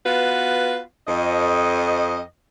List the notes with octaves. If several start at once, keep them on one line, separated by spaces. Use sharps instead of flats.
B3 F4 F#4 B4
F2 D#5